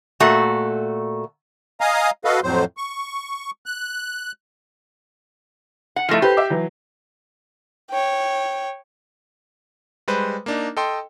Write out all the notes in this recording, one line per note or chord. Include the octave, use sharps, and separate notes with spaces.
A#2 A3 F#4
D#5 F5 G#5 A#5 D#6
F#4 A4 B4 D#5 F5
F2 A2 F#3 C5
C#6
F#6
F#5
F3 A3 E4 A#6 C7
G4 A4 B4 C5
E5 D6
E3 F#3
C#5 G5
G3 G#3 B4 C5
A#3 D4 D#4
A4 D#5 G5 C6